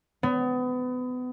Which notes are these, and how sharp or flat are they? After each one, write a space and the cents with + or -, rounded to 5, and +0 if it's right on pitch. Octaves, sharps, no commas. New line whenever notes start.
B3 +30